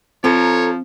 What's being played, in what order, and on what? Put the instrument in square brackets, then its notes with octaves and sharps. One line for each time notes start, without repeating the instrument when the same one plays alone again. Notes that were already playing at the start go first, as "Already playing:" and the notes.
[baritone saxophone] F3 [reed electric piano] C4 [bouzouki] A4 A#5 [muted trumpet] C#5